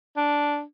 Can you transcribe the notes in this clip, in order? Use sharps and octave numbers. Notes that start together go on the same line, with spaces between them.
D4